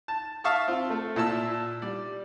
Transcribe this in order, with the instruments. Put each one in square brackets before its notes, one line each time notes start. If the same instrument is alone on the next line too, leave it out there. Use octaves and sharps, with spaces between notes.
[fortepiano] A5
E5 F5 A5 C#6 D#6 F6
C4 F4
A3
A#2 E4 A5 E6
G3 D5